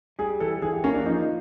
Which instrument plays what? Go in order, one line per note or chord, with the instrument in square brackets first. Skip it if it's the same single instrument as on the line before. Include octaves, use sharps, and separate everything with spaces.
[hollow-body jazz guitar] G3 [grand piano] G#4
[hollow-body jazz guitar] E3 [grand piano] A4
[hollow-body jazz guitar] E3 [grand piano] G#4
[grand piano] G4
[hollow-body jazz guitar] A#3 [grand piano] C#4
[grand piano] D4
[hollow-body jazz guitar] F3 [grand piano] D#4